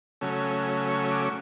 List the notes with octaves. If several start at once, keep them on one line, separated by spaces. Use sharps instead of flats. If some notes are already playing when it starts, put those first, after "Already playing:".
C#3 F#3 A3 C#4
C#6
D6
C#6